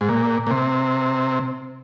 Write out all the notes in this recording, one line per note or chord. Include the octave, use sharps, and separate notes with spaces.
G#2
A#2
A#2
C3